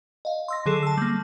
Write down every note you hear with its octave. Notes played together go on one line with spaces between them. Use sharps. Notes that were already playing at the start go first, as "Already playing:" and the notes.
D#5 F5
C6 E6 A#6
D3 F#3 G#4 A4 C7 E7
A5 E6
G3 A#3